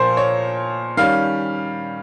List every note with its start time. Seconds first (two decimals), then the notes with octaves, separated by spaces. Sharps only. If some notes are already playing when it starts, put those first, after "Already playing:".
Already playing: A#2 F3 A#4 C5
0.17 C#5
0.97 D#3 G3 C#4 F5